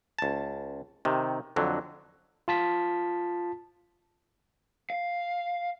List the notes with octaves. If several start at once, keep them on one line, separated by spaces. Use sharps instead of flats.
C#2 A5
C3 D#3
F2 D3 F#3
F4 A5 B6
F5